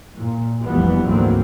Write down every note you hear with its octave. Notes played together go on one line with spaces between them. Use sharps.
A#2
F1 A#1 E3 G3 B3
D2 G#2 F#3 A#3 C4